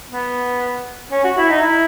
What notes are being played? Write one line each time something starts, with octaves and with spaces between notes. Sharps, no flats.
B3
C#4
F#4
E4
D#4
E4